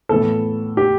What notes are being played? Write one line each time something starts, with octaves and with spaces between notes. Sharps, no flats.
A2 E3 B3 A4
G4